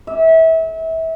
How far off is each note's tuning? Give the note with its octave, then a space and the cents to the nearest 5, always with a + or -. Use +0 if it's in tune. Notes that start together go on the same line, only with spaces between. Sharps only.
E5 -30